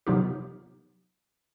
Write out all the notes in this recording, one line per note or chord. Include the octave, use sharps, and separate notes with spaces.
C3 F#3 B3 D#4 F4 G4